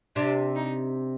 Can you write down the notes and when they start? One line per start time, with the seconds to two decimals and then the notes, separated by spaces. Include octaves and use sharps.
0.16 C3 D4
0.55 D#4